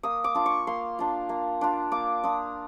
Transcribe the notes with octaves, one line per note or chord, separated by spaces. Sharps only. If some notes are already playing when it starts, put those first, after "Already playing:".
A#3 D#6
D6
D4 F4
C#6
A#3 C6
D4 F4
A#3
D4 F4
A#3 D6
D4 F4 D#6